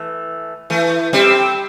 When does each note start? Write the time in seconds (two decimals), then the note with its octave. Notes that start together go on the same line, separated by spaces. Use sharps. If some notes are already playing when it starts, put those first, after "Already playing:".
Already playing: E3 A3
0.70 E3 A3
1.13 G3 C4